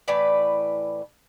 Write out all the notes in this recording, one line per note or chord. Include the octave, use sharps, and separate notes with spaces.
A2 E3 B4 D5